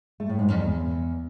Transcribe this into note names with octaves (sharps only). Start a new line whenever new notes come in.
A3
A2
G#2
F2
E2